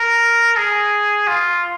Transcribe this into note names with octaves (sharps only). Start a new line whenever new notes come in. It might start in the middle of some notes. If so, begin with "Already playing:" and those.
Already playing: A#4
G#4
F4